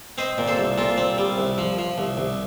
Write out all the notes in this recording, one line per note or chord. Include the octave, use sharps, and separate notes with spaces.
C4 C5 D#5
A#2
A4 C5
C2
A#2 F4 A4
C4
G3
C2
F3
F3
C2
C2